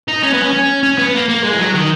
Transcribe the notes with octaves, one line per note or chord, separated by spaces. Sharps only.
D#4
C#4
B3
C#4
C#4
C#4
B3
A#3
A#3
G#3
E3
F#3
D#3